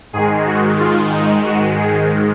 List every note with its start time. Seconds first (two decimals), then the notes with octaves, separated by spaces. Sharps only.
0.13 G#2 D#3 G#3 G#4
0.46 F#4
0.79 F4
1.12 D#4
1.45 F#4
1.78 G#4